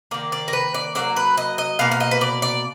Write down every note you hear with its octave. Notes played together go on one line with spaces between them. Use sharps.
D#3 A#3 D5
D5
A#4
B4
D5
D3 F#3 A#3 D5
B4
D#5
D#5
B2 A#3 F5
F5
D#5
B4
D5
D5